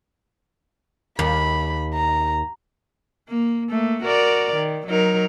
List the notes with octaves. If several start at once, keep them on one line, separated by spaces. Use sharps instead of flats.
D#2 B5
A#5
A#3
A3 A#3
F#4 A#4 D5
D#3
F#3 D#4 A#4